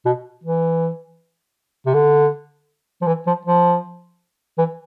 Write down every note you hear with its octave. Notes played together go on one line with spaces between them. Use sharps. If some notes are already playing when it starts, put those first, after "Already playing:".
B2
E3
C3
D3
F3
E3
F3
F3
E3